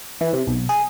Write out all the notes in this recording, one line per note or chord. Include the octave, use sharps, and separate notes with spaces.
E3
C3
B1
G#4